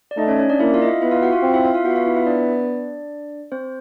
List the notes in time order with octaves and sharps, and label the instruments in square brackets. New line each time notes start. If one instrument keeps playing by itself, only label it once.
[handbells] D5
[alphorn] A3 [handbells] D#4 D#5
[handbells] C#4 C#5
C#4 C#5
D4 D5
[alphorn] A#3 [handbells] E4 E5
[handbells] F4 F5
D#5
E4 E5
[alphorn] B3 [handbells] E4 E5
[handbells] F4 F5
F#4 F#5
F4 F5
[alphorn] C4
[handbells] E4 E5
F4 F5
F4 F5
[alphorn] B3 [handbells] F#4 F#5
[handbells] E5
F4 F5
E4 E5
E4 E5
D4 D5
C4 C5